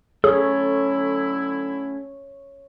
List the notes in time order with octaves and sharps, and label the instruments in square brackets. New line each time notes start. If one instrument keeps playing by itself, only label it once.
[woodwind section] D3 F#3 E4 [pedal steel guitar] A3 C#4 [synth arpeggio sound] G#4 [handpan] C#5